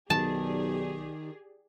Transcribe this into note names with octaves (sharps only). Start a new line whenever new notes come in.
B1 D#3 G4 G#4 D5 A5